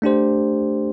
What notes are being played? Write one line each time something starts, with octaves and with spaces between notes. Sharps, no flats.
A3 D4 G4 C5